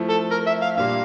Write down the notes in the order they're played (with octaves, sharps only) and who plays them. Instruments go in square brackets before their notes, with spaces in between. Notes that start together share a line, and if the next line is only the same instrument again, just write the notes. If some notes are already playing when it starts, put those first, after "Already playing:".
Already playing: [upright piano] F3 A3 C4 E4
[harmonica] A4
A#4
E5
F5
[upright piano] A#2 G3 A#3 D4 [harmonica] F5